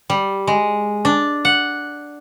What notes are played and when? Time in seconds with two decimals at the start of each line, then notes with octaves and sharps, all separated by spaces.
0.10 G3
0.47 G#3
1.05 D4
1.45 F#5